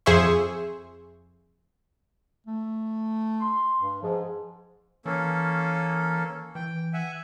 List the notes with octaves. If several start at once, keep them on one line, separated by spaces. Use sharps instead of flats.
F2 G#4 C5 E5 C#6
A3
C6
G2
G#2 F3
E3 A#3 C#4 A4
E3 G5
E5 F#5 G#5